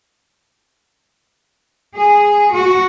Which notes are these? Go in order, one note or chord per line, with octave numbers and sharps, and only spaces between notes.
G#4
F#4